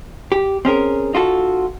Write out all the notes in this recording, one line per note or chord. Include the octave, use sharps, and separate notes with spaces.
G4
C4 C#4 G#4 A#4
D#4 F4 F#4 A4